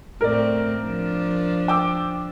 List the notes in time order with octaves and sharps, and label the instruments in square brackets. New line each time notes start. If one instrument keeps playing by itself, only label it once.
[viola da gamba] A2 A3 C4 [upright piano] A#4 D5
[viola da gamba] F3 D4
[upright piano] G5 D6 E6